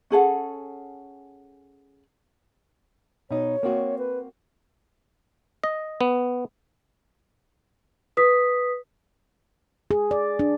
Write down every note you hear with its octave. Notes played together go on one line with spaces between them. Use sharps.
C#4 G#4 A4 F#5
B2 D#4 C#5
A#3 C4 F#4
B4
D#5
B3
B4 D#6 B6
G#4
D5
D4